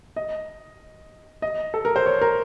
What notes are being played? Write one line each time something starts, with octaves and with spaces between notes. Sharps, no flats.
D#5
D#5
A4
A#4
C5
C#5
A#4